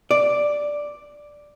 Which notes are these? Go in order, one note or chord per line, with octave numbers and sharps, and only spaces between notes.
D5